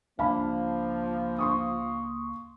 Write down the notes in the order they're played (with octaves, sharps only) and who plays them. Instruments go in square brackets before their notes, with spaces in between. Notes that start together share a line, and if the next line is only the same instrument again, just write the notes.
[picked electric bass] C#2 G3 D4 [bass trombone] F3 [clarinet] A#3 [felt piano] F5 A5 B5
[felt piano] C6 C#6 D#6